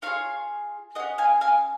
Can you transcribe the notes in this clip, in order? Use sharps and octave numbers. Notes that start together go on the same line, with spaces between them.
C#4 F4 G#4 C#5 F5
C#4 G#4 D#5 F#5
F5 G#5
F5 G#5